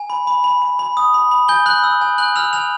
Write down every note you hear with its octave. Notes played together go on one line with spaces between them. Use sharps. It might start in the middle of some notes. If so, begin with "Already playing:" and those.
Already playing: G#5
B5
B5
B5
B5
B5
D#6
B5
B5
G#5 G6 G7
B5 F#6 F#7
E6
G#5
G#5 F#6 F#7
E6 F6 F7
G#5 F6 F7